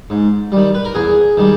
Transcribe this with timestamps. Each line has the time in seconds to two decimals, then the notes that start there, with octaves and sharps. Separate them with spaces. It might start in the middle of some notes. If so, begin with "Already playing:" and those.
0.10 G#2
0.52 D#3 G3
0.74 B4
0.85 A#4
0.95 E2 G#4
1.37 D#3 G3